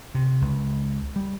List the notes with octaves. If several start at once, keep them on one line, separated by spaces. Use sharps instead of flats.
C3
C#2
G3